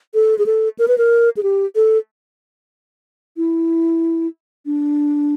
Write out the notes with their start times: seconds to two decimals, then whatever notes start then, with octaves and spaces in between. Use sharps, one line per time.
0.14 A4
0.38 G#4
0.46 A4
0.79 A#4
0.88 B4
0.98 A#4
1.37 G#4
1.43 G4
1.75 A4
3.37 E4
4.66 D4